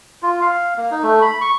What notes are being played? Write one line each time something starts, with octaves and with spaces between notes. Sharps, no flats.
F4
F5
A#3
D#4
A3
B5
C#6